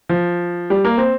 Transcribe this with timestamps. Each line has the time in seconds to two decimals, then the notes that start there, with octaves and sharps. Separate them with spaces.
0.09 F3
0.70 G3
0.85 A#3
0.97 C4